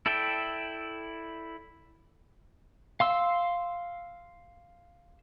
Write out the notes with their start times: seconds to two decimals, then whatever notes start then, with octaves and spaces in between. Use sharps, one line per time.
0.06 E4 A4 D5 E5 G5
3.00 F5 C6 E6